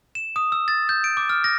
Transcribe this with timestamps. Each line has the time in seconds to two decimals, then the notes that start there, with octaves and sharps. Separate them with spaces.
0.15 E7
0.36 D#6
0.52 E6
0.68 A6
0.89 G6
1.04 D7
1.17 D6
1.29 F6
1.44 A#6